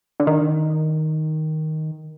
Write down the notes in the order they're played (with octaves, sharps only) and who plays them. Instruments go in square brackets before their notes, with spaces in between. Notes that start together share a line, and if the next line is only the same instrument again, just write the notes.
[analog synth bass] D3
D#3